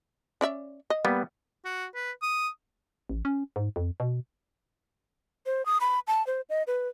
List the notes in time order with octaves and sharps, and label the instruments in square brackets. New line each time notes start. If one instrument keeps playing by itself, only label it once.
[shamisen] C#4 D5 E5
D#5
[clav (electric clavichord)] G3 B3 [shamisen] A#3
[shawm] F#4
B4
D#6
[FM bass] A1
C#4
G#2
F2
B2
[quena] C5
D#6
B5
A5
C5
D#5
B4